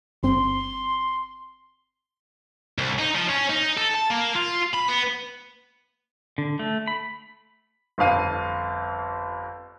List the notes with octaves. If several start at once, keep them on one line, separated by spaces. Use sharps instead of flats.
G1 C4 C6
C2
D#4
F3
C#4
D#4
A4
A5
A#3
F4
B5
B3
D3
A3
B5
G1 F2 F5 D#7